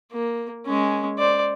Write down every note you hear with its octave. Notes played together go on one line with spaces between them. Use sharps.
A#3
G#3 C#4
C5 D5